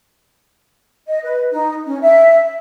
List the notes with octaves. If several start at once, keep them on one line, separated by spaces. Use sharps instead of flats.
D#5
B4
D#4
C#4
E5